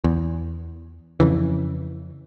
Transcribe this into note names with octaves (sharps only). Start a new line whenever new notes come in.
E2
F2 C#3 E3